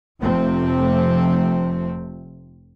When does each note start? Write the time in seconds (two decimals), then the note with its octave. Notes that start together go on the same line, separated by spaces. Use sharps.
0.21 F1 C3 F3 A3 C4